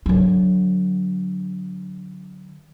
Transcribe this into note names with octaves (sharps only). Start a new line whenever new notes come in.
D3 F#3